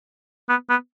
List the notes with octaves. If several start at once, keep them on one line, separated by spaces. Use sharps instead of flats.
B3
B3